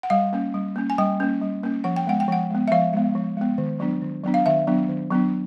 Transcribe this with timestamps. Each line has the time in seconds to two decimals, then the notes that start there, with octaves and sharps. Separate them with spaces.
0.03 F#5
0.10 G3 F5
0.33 A#3 C#4
0.54 G3
0.76 A#3 C#4
0.90 G#5
0.98 G3 G5
1.20 A#3 C#4
1.42 G3
1.63 A#3 C#4
1.84 F3 F#5
1.96 G5
2.07 G#3 B3 F#5
2.20 G5
2.28 F3 F#5
2.50 G#3 B3
2.68 E5
2.72 F3 F5
2.93 G#3 B3
3.15 F3
3.37 G#3 B3
3.58 D#3
3.80 F#3 B3 D4
4.02 D#3
4.24 F#3 B3 D4
4.34 F5
4.46 D#3 E5
4.67 F#3 B3 D4
4.89 D#3
5.10 F#3 B3 D4